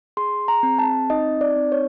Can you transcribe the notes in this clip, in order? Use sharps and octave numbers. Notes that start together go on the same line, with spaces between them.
G#4 C6
A#5
C4
A5
D#4 D#5
D5
C4
C#5